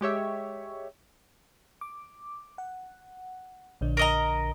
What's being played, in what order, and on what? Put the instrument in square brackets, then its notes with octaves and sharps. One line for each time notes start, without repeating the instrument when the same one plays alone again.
[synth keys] G#3 G4 C#5 E5
[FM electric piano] D6
F#5
A#1 D3 D4
[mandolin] A#4 D#5 A#5